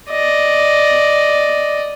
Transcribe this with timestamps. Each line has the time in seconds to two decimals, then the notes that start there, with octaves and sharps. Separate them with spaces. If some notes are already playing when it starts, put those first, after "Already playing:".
0.10 D5 D#5